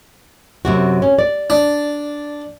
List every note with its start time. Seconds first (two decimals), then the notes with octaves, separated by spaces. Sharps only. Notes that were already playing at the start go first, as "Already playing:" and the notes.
0.65 F#2 C3 F#4
1.02 C#4
1.19 D5
1.50 D4